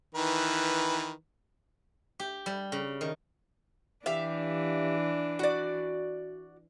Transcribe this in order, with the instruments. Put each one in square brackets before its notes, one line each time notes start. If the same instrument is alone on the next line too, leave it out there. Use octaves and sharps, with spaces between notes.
[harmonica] D#3 E3 B4
[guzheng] G4
G3
C#3
D#3
[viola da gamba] E3 D4 [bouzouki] G4 E5 F5
[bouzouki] F#4 D5